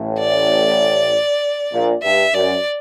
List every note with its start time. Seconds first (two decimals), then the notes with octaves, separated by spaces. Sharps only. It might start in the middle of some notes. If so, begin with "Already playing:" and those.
Already playing: A1 A2
0.19 D5
1.72 A#1 A#2
2.03 G2 E5
2.33 F#2 D5